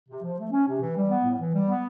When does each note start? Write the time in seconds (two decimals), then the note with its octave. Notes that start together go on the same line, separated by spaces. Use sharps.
0.09 C3
0.23 F3
0.38 A3
0.52 C#4
0.67 C3
0.81 E3
0.95 G3
1.10 B3
1.24 A2
1.40 E3
1.54 G3
1.68 B3